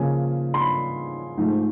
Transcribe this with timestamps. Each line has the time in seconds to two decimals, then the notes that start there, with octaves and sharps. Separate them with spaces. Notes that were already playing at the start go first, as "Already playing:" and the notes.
Already playing: C#3 F3 A#3 G#5
0.54 C6
0.60 B5
1.38 G#2 F3 A3